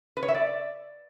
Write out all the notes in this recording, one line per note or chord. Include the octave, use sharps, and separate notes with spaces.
B4
C#5
E5
D5